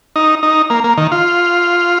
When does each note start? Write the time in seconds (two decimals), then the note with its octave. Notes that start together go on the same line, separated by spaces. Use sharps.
0.16 D#4
0.43 D#4
0.70 A#3
0.84 A#3
0.97 D#3
1.12 F4